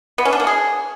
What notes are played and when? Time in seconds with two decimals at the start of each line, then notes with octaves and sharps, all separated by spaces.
0.18 B3
0.25 C#4
0.33 D4
0.40 A#3
0.47 G#4